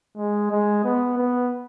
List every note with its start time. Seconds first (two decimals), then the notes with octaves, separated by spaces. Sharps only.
0.16 G#3
0.51 G#3
0.84 B3
1.17 B3